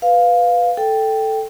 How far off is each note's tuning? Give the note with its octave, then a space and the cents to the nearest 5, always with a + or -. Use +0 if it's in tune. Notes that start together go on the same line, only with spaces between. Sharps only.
B4 +0 F5 +5
A4 +0 G5 +0